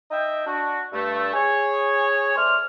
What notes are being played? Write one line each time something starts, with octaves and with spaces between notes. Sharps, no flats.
D#4 D#5 E5 G5
D4 F#4
G2 A3
G#4 C#5
A3 C5 D5 F6